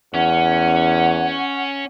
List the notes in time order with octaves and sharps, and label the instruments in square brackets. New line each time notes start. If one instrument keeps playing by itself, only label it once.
[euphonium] E2 [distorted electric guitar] C#4 [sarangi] F#5